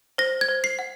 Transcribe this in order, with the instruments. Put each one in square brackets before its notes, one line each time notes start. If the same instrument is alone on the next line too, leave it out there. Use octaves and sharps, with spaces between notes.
[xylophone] C5 A#6
G#6
C5
C7
F#5